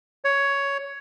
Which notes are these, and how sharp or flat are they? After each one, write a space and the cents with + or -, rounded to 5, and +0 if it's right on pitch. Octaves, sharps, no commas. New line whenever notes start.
C#5 +10